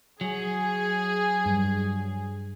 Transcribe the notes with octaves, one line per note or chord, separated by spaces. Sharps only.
F#3 G#4
G2